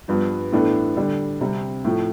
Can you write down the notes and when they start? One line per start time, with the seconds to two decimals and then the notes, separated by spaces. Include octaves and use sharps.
0.08 G2 F3 B3
0.52 A2 E3 B3 D4 A4
0.97 D3 G3 D4
1.41 C3 G3 C4
1.85 A2 F3 A3